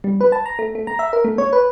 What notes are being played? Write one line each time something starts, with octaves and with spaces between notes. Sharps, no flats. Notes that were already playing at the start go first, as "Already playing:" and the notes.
G3
B4
A5
A#5
A3
A3
A#5
E5
A#4
A3
C#5
B4